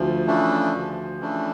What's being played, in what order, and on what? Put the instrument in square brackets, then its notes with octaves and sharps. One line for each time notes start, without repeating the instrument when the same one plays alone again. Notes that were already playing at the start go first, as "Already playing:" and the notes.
Already playing: [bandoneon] D2 [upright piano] F3
[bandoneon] C#3 E3 A3 D4
D2
C#3 E3 A3 D4